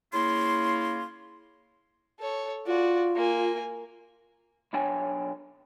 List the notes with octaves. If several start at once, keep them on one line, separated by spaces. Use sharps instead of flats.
C#3 A#3 E4 F4 C#5 C6
A4 C#5
F4 F#4 D5
A#3 G#5
B1 F#3 D4 C#5 G5 G#5